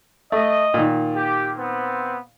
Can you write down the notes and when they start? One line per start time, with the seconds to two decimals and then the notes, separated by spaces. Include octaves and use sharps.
0.32 A3 D#5
0.74 A#2 D#3
1.16 G4
1.57 B3 C4